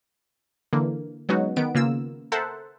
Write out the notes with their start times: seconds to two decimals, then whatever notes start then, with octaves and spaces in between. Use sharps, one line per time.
0.73 D3 E3 A#3
1.29 F#3 G#3 B3 C#4 D#4 F#4
1.56 D#3 B3 D7
1.75 C#3 A#3 F4 E6
2.32 A4 A#4 C5 E5 F#5 A5